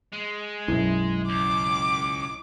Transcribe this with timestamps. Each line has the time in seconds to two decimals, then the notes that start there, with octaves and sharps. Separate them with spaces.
0.13 G#3
0.68 B1 F#2 E4
1.29 C#2 D6